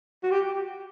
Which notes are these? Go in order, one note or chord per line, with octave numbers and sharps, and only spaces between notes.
F#4
G4